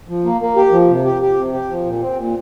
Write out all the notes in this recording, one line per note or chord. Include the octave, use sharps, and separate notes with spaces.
F3
A#3
A#3
G4
F3
C3
G4
G4
C3
G4
F3
A#2
C4
A#2